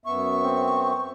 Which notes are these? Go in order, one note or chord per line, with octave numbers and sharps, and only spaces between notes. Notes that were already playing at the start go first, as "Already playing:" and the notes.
F#2 B3 E5 C#6
C4